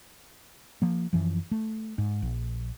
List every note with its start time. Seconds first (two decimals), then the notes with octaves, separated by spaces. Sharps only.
0.82 F3 A#3
1.13 F#2 E3 F3
1.51 A3
1.98 G#2
2.22 A#1